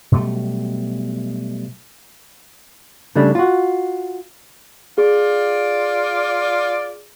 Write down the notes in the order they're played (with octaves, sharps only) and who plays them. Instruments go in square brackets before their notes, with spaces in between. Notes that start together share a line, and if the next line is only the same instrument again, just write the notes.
[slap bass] B2 F#3 G3 A3
[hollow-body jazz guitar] C#3 G3 A3 D4
F4 F#4
[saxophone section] F4 D5 [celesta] G#4